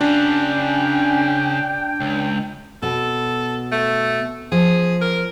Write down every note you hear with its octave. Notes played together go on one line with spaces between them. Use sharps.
C#3 C#4 D4 F#4 G5
C#2
B2 A4
A3
F3 G#4
A#4